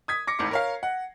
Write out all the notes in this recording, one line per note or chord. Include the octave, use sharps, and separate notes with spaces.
D#6 G#6 B6
D6 A#6 C#7
G#1 D#2 A2 D6 C#7
A#4 C#5 F5
F#5